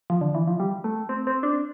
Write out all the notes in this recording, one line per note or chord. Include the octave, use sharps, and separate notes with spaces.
F3
D3
E3
F3
G3
A3
C4
C4
D4